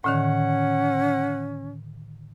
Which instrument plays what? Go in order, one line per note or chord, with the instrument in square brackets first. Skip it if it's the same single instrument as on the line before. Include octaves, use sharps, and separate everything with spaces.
[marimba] A2 D3 D#3 [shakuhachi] C#4 [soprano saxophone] F#5